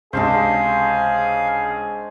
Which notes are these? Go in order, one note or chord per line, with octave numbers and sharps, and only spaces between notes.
C#2 C3 G#3 D4 G#4 C5 F5